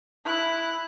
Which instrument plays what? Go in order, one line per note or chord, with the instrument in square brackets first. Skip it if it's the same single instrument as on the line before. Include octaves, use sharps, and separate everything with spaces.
[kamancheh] E4 F#6